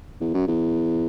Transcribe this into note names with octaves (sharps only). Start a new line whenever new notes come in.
E2
F#2
E2